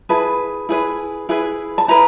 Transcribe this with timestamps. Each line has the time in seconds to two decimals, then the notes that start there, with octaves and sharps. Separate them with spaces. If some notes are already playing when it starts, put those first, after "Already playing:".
0.09 E4 G#4 B4 A5
0.69 E4 G#4 B4
1.29 E4 G#4 B4
1.78 A5
1.88 E4 G#4 B4 A#5